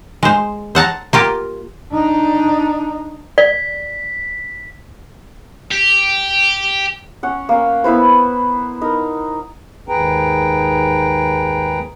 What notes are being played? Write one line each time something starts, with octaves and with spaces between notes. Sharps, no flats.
G#3 C5
C5 F#5 A5 A#5
A#3 F4 G4
D4 D#4
D5 B6
G4
C#4 F#5
A#3 C#4
B3 E4 B4 C5
D#4 A#4
D#2 G#2 G#4 B4 G5 A#5